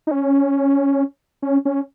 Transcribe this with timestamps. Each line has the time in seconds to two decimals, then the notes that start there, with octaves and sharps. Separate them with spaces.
0.07 D#4
0.11 C#4
1.42 C#4
1.65 C#4